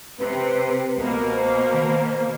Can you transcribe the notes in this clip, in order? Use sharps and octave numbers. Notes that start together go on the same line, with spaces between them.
C3 B4
C#2 B2 A#3 A#4
C5
D#3